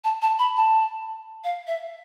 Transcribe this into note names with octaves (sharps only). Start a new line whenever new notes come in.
A5
A5
B5
A5
F5
E5